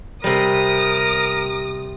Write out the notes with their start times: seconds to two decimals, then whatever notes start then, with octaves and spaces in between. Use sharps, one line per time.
0.24 C3 G3 A#4 D#6